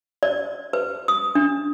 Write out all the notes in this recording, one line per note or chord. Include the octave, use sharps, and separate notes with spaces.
D5
B4
D#6
D4